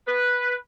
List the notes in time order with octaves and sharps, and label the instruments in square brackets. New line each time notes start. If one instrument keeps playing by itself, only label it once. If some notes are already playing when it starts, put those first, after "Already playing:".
[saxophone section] B4